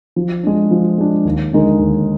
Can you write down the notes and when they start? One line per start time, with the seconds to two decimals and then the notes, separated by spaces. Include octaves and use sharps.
0.16 F3
0.43 G#3 D4
0.71 F3
0.98 G#3 D4
1.25 D#2
1.53 D3 G#3 D#4 A#4
1.79 D#2